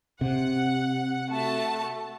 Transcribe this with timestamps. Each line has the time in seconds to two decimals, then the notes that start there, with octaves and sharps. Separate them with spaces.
0.21 C3 F#5
1.31 A3 F#4 A5